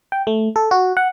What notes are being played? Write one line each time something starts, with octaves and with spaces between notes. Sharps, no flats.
G5
A3
A4
F#4
F#5